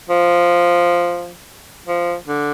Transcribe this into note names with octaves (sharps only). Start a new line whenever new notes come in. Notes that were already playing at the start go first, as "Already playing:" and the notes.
F3
F3
D3